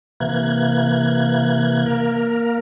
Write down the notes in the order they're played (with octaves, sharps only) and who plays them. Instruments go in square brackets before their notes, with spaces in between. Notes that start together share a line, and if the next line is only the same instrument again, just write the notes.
[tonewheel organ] C3 E3 A#3 F#6 G#6
A#3 A#4